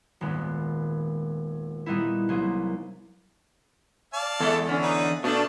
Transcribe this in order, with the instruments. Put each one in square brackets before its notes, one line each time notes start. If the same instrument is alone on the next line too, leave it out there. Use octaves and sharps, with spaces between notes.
[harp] D#1 G#1 G#3 B3
A#2 G3 B3 D#4 E4
C2 F#3 A#3 G#4
[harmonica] D5 F5 A5
[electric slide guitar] E2 [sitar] G#3 A4
[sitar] D3 C#4
[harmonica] D#4 B4
[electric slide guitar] B2 [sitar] A3 D4 [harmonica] A4 F5